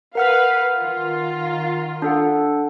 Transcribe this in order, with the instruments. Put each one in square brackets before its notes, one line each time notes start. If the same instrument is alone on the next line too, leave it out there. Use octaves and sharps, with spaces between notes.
[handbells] A#4 F#5 F6 [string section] B4 F5
[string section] D#3 F4
[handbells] D4 A4 F#5